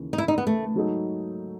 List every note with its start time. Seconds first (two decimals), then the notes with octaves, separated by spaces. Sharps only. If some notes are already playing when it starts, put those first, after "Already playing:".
Already playing: D#2 C#3 E3
0.13 D#4
0.18 E4
0.28 D#4
0.38 B3
0.47 A3
0.75 G#2 F#3 A3 D#4